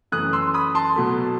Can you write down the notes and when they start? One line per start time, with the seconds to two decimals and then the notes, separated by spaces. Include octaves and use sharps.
0.12 F#2 E3 A3 D#6 F#6
0.33 C6 E6
0.54 B5 D#6
0.75 A5 C6
0.96 B2 F#3 A3